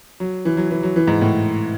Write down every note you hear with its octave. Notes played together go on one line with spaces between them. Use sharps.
F#3
E3
F#3
E3
F#3
E3
G#2
A2